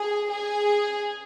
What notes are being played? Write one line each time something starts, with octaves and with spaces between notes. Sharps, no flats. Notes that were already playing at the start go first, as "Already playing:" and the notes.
Already playing: G#4
G#4